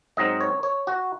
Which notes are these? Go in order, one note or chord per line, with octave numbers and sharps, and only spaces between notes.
G#2 F#3 C4 D#4 D#5
C#5
C#5
F#4